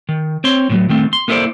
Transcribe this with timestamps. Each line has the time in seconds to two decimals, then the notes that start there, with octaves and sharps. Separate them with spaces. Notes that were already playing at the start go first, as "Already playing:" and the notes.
0.09 D#3
0.44 C4 C#5 C6
0.70 A2 D#3 F#3
0.89 D#3 A3 C4
1.13 C6
1.28 A#3 B3 E4 A4 C5 D5